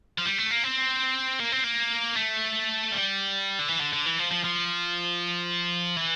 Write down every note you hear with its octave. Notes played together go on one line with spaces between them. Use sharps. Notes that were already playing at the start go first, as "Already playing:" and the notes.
F3
G3
A3
A#3
C4
A#3
C4
A#3
A3
G3
D3
E3
D3
D3
E3
F3
F3
F3
E3